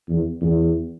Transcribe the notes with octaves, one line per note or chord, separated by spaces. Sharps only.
E2
E2